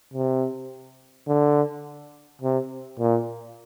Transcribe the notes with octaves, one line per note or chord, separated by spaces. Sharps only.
C3
D3
C3
A#2